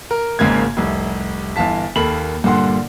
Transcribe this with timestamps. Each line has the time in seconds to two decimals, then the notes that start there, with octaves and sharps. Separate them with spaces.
0.11 A#4
0.39 G#1 G#2 C#3 A#3 G#6
0.77 F1 C2
1.56 G1 E3 F5 A5 B6
1.96 D#2 A#3 A4 B5 F#7
2.44 G2 A#2 D3 F#5 C6